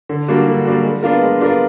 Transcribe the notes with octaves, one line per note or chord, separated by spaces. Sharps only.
D3
G3 A#3 D4 F#4
D3
G3 A#3 D4 F#4
G#3
B3 D4 F4 A#4
G#3
B3 D4 F4 A#4